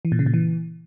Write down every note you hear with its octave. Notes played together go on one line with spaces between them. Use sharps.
E3
A#2
C#3
A#2
E3